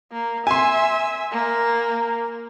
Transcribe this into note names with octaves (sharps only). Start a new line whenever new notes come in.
A#3
E5 G#5 C6
A#3